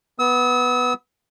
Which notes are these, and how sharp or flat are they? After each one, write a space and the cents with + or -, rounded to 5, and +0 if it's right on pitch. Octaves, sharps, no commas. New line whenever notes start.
B3 +0 E6 -40